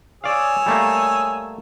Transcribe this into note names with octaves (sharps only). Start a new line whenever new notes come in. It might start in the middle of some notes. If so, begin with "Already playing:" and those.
G#4 C#5 D5 F5 E6
G3 A3 A#3